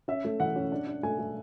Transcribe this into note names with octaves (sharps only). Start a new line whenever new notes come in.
C#4 E5
A3
E3 F#5
C#4
D4
D4
A3 G#5
A3